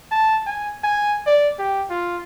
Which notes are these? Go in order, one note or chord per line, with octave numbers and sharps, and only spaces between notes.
A5
G#5
G#5
D5
G4
F4